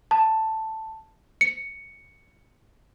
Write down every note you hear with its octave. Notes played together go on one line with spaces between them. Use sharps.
A5
C#7